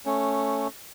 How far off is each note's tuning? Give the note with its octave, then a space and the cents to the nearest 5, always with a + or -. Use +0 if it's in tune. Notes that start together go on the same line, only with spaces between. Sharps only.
A3 +0 C#4 +0